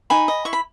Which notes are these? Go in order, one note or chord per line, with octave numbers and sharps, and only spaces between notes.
D#4 G#5 B5
D#5
E4 C#6
B5